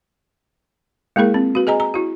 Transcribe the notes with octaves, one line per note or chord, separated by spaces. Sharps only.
G#3 A#3 E4 G#4 A#4
C4
F#4 B4
G#4 D#5 G#5 A#5
A#5
E4 F#4